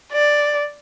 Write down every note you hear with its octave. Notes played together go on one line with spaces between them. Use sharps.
D5